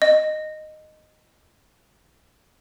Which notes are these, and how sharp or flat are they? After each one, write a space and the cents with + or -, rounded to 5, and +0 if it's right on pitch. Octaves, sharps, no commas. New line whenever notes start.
D#5 -10